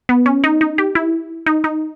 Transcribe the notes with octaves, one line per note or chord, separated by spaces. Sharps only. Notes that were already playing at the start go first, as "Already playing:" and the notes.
B3
C#4
D#4
D#4
G4
E4
D#4
D#4